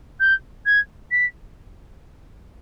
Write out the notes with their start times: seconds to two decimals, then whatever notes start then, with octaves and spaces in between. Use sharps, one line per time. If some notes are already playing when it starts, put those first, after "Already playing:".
0.20 G6
0.65 G#6
1.11 B6